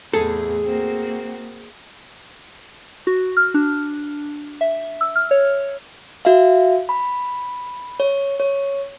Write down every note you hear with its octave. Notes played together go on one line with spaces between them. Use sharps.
E2 A2 C3 G#4 A4
A#3 C4 F#4
F#4
F6
D4
E5
E6
F6
C#5
F#4 E5 F5
B5
C#5
C#5